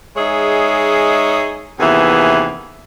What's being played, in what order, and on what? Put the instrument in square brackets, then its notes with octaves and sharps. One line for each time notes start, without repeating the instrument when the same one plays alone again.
[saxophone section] G#3 D#4 G#4 C#5 E5
D#2 C3 E3 B3 G#4